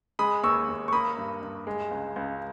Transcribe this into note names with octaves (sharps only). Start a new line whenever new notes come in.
G#3 B5 D#6
D#2 C#6 E6
D#2
C#6
A#3 B5 D#6
G2
G2
G#3
C#2
C#2